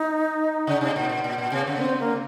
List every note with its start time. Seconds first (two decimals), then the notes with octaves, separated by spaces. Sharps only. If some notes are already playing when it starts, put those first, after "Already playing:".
Already playing: D#4
0.67 C#3
0.81 C3
0.96 A#2
1.09 A#2
1.24 A#2
1.38 A#2
1.52 C3
1.67 C#3
1.77 A#3
1.81 C4
2.00 A#3